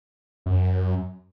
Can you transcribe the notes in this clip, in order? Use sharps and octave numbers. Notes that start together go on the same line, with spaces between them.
F#2